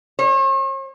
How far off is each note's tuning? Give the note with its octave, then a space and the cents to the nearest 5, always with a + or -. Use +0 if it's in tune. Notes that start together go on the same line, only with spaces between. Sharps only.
C#5 -45